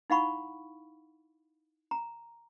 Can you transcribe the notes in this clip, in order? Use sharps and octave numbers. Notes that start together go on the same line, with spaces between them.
D#4 E4 F5 F#5 B5 C#6
A#5